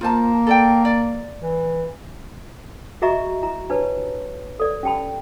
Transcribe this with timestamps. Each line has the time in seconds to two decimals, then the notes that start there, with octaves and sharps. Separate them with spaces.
0.01 A#3 F4 C5 A5
0.47 A4 D5 G5
0.85 D5
1.42 E3
3.02 F#4 G#4 D#5 E5 A#5 C#6
3.43 E4 A#5
3.70 D4 G4 B4 C#5 A5
4.60 A4 D5
4.83 C#4 G4 G5 A5 B5